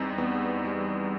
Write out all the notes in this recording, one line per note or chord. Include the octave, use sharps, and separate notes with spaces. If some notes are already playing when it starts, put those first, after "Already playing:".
Already playing: E2 G3 C4 D#4
E2 B3
G3